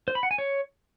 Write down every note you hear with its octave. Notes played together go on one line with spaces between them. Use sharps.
C5
B5
F#5
G#5
C#5